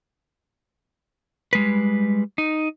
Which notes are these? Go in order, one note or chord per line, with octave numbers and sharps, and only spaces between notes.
G3 G#3 B4
D#4